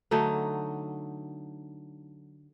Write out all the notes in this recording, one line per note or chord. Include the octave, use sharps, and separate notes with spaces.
D3 F#3 A3 D#4